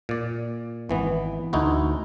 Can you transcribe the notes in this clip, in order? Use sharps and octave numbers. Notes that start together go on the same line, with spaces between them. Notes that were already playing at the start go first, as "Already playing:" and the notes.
A#2 D5
G#1 E3 B3
D2 D#4 E4 F#4